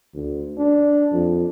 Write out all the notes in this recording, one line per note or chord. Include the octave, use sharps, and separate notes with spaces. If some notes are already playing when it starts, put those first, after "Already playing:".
D2
D4
F2